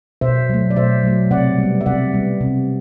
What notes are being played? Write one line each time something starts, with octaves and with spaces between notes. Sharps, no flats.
B2 C5 E5
F#3 A3
D5
B2 C5 E5
F#3 A3
C3 D5 F#5
G3 B3
E5
C3 D5 F#5
G3 B3
C3